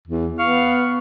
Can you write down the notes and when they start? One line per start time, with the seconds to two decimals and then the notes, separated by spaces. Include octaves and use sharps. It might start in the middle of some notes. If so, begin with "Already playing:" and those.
0.07 E2
0.39 B3 F5 C#6